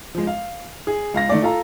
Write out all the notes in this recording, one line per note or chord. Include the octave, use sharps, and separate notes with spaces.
F3 G#3
F5
G#4
C#2 F5 A#6
D#3 A3 D5
F4 A4 F5 A#5